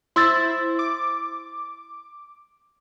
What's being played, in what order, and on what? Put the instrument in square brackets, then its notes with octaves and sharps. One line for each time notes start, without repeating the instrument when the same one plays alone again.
[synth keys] E4 C5 [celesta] C6 E6 A6
[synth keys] D6